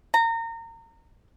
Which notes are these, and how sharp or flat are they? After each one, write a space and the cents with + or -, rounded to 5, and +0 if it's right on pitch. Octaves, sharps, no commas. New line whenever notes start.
A#5 -30